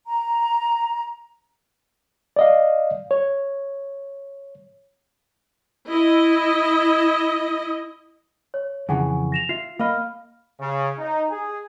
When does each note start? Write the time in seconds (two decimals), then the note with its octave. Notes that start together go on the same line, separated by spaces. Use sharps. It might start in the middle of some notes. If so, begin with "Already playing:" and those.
0.07 A#5
2.36 D5 D#5 F5
3.11 C#5
5.89 E4 D#5
8.54 C#5
8.89 F2 C#3 E3 G#4 F#5 G#5
9.32 A#6 E7 F7
9.49 F4 E5 C7
9.79 A#3 D#5 F5 B5 F6
10.60 C#3
10.99 D#4
11.30 G#4